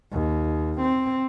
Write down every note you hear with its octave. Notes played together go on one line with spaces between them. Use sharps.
D#2
C4